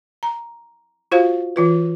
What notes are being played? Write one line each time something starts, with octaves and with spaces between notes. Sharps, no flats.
A#5
F4 F#4 C5 F5
E3 F4 B4